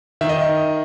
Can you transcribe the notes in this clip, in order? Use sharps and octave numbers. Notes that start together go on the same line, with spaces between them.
D#3 E5
D#5